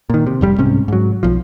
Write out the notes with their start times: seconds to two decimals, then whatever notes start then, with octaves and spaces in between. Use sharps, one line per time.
0.10 A#2 D#3
0.27 C3
0.41 F1 G2 G3
0.58 C2 G#2 C3 C#4
0.88 G#2 F#3
1.23 B1 F3